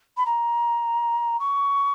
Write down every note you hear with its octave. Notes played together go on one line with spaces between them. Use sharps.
B5
A#5
C#6